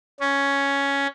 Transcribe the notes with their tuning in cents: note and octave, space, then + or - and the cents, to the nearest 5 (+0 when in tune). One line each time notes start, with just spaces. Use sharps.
C#4 +5